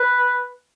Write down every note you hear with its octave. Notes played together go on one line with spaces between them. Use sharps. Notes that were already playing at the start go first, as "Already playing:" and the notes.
Already playing: B4